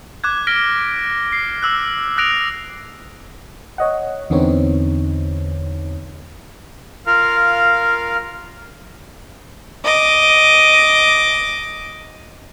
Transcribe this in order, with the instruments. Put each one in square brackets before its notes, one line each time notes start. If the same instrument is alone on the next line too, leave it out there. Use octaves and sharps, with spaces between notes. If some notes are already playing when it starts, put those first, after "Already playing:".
[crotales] D6 F#6 G#6
F6 A#6 B6 D7 G7
C7
D6 E6 F#6
D#6 F#6 A#6 D7 F7
[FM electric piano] C#5 D#5 F#5
E2 D3 B3 C4 D#4 C#5
[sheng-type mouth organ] F4 A#4 F5
[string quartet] D#5 D6